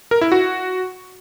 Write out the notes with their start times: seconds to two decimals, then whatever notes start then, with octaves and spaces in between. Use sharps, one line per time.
0.11 A#4
0.21 E4
0.32 F#4